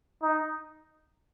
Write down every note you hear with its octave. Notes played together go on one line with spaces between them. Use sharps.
D#4